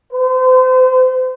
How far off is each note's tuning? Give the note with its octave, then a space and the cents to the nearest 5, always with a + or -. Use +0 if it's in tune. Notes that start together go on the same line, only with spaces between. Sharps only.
C5 -35